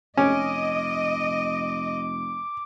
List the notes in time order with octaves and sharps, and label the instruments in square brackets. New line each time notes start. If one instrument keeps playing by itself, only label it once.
[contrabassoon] F1 [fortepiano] C#4 [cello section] D#5 [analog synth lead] D6